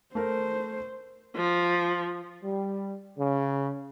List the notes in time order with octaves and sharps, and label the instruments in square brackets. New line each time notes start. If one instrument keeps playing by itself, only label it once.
[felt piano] A3 A#4 [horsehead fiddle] C5
[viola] F3
[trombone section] G3
C#3